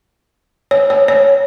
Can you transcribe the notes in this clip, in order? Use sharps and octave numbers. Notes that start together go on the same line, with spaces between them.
C#5
C#5
C#5